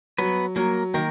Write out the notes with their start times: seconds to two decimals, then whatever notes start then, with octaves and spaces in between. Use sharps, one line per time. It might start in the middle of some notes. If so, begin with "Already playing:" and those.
0.18 F#3 B3 B4
0.56 F#3 A#3 A#4
0.94 D#3 A#3 A#4